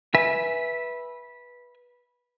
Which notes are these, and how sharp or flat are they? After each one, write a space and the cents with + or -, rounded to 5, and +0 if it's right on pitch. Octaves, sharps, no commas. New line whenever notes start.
B4 -15 E5 +0 G#5 +0